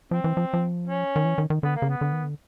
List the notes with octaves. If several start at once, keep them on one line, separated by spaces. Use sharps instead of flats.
F3 C4
E3
F3
F3
C#4
D#3
E3
D#3
D#3
D3 B3
A#3
C#3
B3
D3
D#3
D3